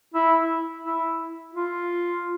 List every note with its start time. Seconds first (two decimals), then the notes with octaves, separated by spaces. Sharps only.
0.14 E4
0.84 E4
1.54 F4